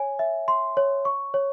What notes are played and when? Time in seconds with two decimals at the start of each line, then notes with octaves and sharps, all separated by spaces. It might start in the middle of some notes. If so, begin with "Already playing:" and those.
Already playing: C#5 G#5
0.19 E5
0.48 C6
0.77 C#5
1.05 C#6
1.34 C#5